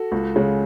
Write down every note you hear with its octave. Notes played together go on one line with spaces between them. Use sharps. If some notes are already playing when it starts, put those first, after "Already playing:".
Already playing: F#4 A4
C#2
C#3 G#3